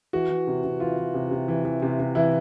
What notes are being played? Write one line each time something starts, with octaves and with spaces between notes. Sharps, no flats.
E3 F#4
E3
C3
C3
E3 F4
E3
C3
C3
E3
E3
C3
C3
E3 E4